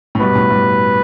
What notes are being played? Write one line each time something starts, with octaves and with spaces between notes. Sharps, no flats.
A2
G2 B2 B4
A2
G2